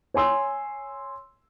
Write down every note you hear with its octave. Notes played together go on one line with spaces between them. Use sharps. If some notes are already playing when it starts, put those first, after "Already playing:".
C#5 G#5 C6 E6